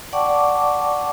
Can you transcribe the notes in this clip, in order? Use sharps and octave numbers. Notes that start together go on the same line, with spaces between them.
D5 F#5 G5 A5 C#6 D6